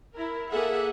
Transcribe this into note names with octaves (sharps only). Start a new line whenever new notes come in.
E4 A#4
A#3 G#4 A4 E5 F#5